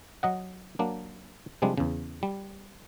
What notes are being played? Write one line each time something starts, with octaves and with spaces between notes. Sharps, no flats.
F#3 D#5 F#5
F#3 A#3 D4
C3 F3 G3 G#3 D4
E2 C#3
G3